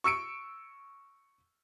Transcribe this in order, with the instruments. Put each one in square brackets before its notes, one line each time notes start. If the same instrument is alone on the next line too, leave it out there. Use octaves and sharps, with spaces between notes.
[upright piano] C#6 E6 C#7 D7